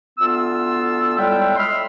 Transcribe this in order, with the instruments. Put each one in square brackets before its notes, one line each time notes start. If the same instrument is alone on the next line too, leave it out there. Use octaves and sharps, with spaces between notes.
[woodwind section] D2 B3 F4 E6
A2 G3 G#3 E5 G5
D#5 E5 B5 C6 E6 F6